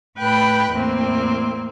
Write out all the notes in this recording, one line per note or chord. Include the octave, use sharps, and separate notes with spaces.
A2 B4 G5 B5 F#6
E2 A2 A#3 C4